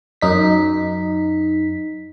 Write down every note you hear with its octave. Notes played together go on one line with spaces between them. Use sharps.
F#2 D#4 B6